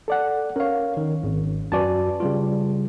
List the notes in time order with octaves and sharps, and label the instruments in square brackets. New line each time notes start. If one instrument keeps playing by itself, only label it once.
[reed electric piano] A4 D5 F#5
[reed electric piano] C#4 C#5 [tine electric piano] A#4 F5
[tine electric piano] D#3
G#1
[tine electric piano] F#2 F#4 G#5 [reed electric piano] B4 D5 A5
[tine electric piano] C#3 G3 F4